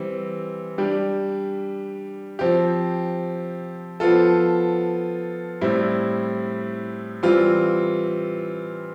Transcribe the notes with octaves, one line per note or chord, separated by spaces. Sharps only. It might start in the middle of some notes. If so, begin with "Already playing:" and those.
Already playing: E3 G3 C4
G3 D4 G4
F3 C4 G4
F3 B3 F4 A4
A2 G3 C4 E4
E3 G3 C4 F4